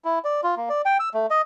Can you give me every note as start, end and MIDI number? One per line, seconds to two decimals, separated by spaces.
0.05 0.19 64
0.24 0.41 74
0.43 0.55 65
0.57 0.69 58
0.69 0.82 74
0.85 0.97 79
1.00 1.09 88
1.14 1.26 57
1.30 1.42 75